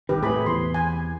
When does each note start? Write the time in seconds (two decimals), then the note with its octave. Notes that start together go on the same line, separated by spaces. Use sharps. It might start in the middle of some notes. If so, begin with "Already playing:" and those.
0.09 C2 D#3 G4 B4
0.23 A2 C3 G#4 B5
0.46 E2 C6
0.74 G#5